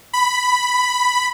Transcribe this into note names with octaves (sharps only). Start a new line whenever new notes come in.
B5